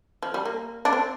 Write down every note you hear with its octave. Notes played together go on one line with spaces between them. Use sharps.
F3
G3
A#3
D4
C4